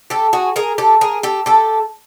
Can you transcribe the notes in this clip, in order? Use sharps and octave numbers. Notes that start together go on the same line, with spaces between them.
G4 A4
F#4 G#4
G#4 A#4
G4 A4
G#4 A#4
G4 A4
G4 A4